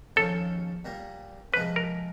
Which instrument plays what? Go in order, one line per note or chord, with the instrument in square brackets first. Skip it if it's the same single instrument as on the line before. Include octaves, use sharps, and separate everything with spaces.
[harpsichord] D#2 C#3 F3 [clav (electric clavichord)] A4
[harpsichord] A#2 G3 A#3
[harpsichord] C3 F3 G#3 [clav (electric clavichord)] B4
[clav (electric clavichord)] A#4